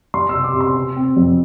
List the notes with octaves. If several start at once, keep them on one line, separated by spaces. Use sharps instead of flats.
G3 C6
E6
C3
D6
C3
C6
C3
C4
F2